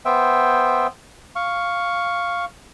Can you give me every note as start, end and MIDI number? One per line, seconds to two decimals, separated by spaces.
0.05 0.87 59
0.05 0.87 72
0.05 0.87 76
0.05 0.87 79
1.36 2.45 77
1.36 2.45 85